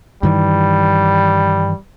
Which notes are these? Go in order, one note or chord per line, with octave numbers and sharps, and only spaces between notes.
G2 D#3 E3 G3